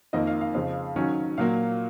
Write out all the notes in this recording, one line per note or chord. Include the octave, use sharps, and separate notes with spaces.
F2 D#3 A#3 D#5
F5
F5
F2 C#3 F3
D#3 F#3 C#4
A#2 F#3 A#3 F5